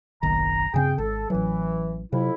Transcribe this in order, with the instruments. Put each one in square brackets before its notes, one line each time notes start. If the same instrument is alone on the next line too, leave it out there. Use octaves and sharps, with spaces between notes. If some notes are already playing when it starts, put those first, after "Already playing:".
[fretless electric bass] F#1 B1 D#3 [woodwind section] A#5
[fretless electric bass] G2 C#3 C4 [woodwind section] G#4 G5
[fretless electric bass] G#1 [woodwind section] A4
[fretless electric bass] A1 F#3 [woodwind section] E3
[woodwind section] F2 E4 [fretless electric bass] C3 F#3